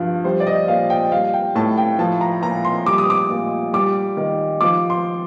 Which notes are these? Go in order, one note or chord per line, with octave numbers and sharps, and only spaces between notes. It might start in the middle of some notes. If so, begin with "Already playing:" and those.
Already playing: G2 F3
G3 C5
D5
D#5
A#2 F5
G5
G3 F5
G5
A2 A5
G5
F3 A5
A#5
A#2 A#5
C6
G3 D6
D#6
D6
A#2
G3 D6
D#3
F3 D6
C6